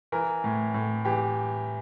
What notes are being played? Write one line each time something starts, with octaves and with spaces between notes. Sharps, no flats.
E3 A#4
A2
A2
E3 G4